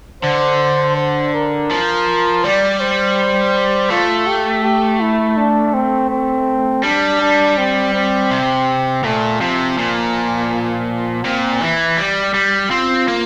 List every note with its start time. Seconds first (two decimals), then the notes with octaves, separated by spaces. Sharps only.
0.23 D3 C5
0.97 C5
1.34 A#4
1.71 F3
2.44 G3 D5
2.80 C5
3.90 A3 F4
4.27 G4
4.63 G4
5.00 E4
5.37 D4
5.74 C4
6.10 C4
6.83 G3 D4
7.21 D4
7.57 C4
7.94 C4
8.31 C3
9.04 A#2 A3
9.40 C3 F3
9.78 A#2
11.24 A#2 C4
11.61 E3 E4
11.97 G3
12.34 G3
12.71 C4 F4
13.08 A#3